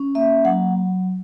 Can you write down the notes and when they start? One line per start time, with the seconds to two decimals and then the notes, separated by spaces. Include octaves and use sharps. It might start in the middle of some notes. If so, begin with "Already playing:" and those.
Already playing: C#4
0.15 A#3 E5
0.45 F#3 F#5